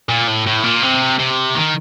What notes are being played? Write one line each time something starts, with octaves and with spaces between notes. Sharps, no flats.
A#2
A2
A2
A#2
C3
C3
D#3